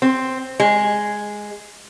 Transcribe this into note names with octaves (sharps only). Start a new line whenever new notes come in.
C4
G#3